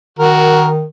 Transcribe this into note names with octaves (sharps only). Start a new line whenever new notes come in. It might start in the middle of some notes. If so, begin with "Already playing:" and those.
D#3 F#4 A#4